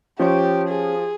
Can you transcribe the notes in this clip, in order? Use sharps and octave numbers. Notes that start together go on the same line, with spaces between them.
F3 C#4 G4 C5 C#5
G#4